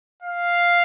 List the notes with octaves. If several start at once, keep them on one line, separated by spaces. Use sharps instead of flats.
F5